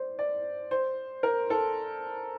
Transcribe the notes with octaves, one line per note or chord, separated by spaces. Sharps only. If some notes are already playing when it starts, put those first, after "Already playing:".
Already playing: C5 D5
D5
C5
A#4
A4